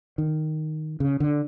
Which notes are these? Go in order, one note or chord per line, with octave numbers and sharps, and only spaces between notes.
D#3
C#3
D3